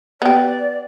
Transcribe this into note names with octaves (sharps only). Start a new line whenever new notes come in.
B3 G4 D5